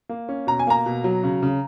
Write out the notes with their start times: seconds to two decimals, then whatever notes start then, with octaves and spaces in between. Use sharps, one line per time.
0.09 A#3
0.29 C#4
0.47 B2 A#5
0.59 G#5
0.67 A#3 A#5
0.86 B2
1.04 F#3
1.24 C#3
1.43 C#3